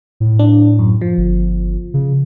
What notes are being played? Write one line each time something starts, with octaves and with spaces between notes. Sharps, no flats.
A2
D4
F#2
F3
G1
C#3